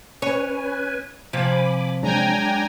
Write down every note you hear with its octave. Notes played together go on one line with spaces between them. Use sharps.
C#4 B4 C#5 G#5
C3 F3 G#5 B5 D6
F#3 G#3 D4 G5 G#5 A#5